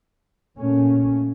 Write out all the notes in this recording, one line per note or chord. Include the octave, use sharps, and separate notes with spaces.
A#2 A3 C#4